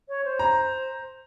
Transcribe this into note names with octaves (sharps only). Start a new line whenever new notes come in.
C#5
C5
A#5